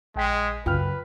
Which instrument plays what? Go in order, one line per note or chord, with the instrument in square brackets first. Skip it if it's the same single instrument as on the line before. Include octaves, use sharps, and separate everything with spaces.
[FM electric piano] A#1 G5 B6 [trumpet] G#3
[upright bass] F#2 C#3 [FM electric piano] F4 G5 F6 [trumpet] B4